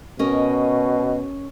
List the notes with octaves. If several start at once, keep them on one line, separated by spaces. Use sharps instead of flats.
B2 C#4 A#4 D#5